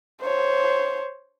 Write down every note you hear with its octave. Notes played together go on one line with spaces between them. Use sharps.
C5 C#5